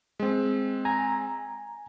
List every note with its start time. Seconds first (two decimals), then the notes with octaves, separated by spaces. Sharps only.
0.20 G#3 C4
0.85 G#5 A#5